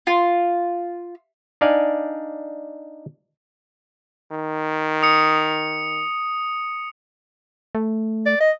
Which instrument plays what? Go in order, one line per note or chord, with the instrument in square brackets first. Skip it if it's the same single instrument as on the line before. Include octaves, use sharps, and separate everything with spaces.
[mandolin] F4
[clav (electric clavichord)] D4 D#4 D5 F5 G#5
[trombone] D#3
[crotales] D#6 C#7
[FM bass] A3
[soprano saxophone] D5
D#5